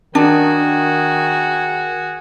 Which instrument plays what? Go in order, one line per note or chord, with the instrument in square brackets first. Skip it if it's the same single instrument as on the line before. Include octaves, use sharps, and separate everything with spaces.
[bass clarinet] D#3 [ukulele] D4 [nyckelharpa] F#4 G#4